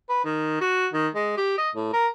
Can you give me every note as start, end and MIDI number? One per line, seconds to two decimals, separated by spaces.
0.09 0.21 71
0.24 0.60 51
0.61 0.87 66
0.93 1.08 51
1.15 1.34 56
1.37 1.54 67
1.58 1.70 75
1.75 1.93 45
1.93 2.08 70